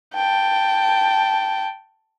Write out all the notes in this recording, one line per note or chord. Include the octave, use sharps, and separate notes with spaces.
G5 A5